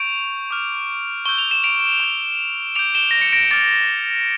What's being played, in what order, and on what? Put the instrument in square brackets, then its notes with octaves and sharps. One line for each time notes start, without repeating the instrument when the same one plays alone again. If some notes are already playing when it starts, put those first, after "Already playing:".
Already playing: [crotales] C#6 G6 D7 F7
D6 F6
C#6 E6 G6 G7
F7
E7
D7 F7
C#6 G6
D6 G6 D7 F7
E7 G7
A#6
C#7
A#6 D7
D6 F6 A6